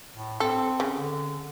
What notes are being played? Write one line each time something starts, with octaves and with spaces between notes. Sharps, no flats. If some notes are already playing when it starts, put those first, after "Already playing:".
A2
C4 A4
C#3
D3